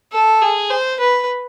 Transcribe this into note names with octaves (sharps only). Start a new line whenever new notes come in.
A4
G#4
C5
B4